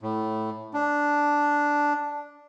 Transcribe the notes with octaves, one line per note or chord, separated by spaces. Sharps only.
A2
D4